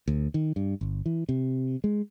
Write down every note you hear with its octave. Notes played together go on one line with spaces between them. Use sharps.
D2
D#3
G2
G1
E3
C3
G#3